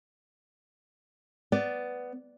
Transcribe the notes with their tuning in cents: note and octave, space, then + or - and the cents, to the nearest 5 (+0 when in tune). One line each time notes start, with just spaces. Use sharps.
B3 +10 D5 +0